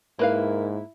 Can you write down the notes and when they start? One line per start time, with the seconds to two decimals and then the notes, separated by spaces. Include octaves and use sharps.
0.19 G#2 A#3 E4 A#4 B4 F5